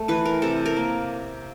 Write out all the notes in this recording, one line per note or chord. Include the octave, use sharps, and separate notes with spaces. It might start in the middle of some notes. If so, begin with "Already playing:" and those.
Already playing: A3
E3 B4
A#4
C3 A4
A#4
A#3